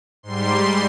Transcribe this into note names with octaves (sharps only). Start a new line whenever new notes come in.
G#2 G3 C6